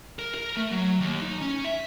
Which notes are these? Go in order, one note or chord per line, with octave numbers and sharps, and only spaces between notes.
A#4
A#4
A3
F#3
D#2
D#4
C#4
E5